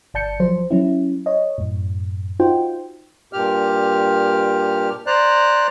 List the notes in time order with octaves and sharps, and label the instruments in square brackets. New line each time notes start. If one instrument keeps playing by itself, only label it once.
[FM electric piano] G1 D5 A5 G6 C#7
F3 F#3 C5
F#3 C#4 E4
C#5 D#5
F#2 A2
D#4 F4 F#4 C5 G5
[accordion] G2 A#2 G4 F6
C5 D5 A#5 F#6